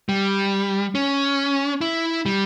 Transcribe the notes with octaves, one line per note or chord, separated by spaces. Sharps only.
G3
C#4
E4
G3